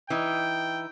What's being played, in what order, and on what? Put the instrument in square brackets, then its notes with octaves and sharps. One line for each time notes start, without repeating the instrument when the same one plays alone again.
[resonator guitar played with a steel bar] E3 D#4 [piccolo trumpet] G5